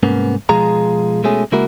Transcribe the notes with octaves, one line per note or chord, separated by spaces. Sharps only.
C2 G#2 A#3 B3 C#4
B2 F3 G#3 F4 G#4 A#5
B2 G#3 A3 C#4 G#4
C#3 G#3 A#3 E4 F#4 A#4